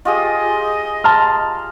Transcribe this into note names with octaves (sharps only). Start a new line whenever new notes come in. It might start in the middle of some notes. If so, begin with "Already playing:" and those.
F4 G4 G#4 D#5
A5 C6 F6